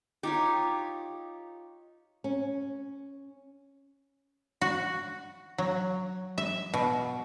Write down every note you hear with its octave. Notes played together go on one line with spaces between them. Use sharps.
D#4 F4 G4 C#5
C#4
F#4
F#3
E5
B2